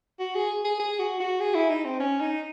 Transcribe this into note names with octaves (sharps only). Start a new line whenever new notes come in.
F#4
G#4
G#4
G#4
F#4
F#4
G#4
E4
D#4
C4
C#4
D#4